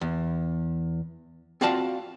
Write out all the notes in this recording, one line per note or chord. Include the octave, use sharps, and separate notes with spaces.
E2
C4 F4 F#4 D5 F5 A5